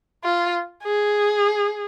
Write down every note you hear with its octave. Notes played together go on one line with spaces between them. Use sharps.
F4
G#4